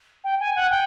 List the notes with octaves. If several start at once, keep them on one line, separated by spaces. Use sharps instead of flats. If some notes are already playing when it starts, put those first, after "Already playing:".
G5
G#5
F#5
G5